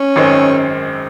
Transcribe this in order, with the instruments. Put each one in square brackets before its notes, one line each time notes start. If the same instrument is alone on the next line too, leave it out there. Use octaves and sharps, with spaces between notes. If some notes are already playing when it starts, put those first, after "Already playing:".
Already playing: [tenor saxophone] C#4
[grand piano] G#1 F#2 D#3 G#3 C4